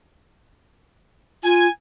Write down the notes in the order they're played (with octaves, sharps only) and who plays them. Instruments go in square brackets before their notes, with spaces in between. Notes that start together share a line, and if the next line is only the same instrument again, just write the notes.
[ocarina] F4 [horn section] G#5